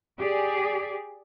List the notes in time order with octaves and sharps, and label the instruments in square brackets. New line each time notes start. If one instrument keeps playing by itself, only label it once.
[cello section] G4 G#4 D5